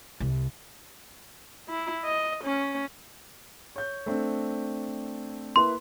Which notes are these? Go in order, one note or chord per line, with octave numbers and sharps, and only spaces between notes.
C2
E4
D#5
C#4
C#5 G6
A3 C4 D4
A#3 E4 B4 C6